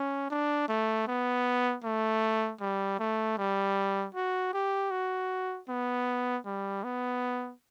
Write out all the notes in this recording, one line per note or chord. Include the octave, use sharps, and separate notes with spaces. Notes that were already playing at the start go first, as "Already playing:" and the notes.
Already playing: C#4
D4
A3
B3
A3
G3
A3
G3
F#4
G4
F#4
B3
G3
B3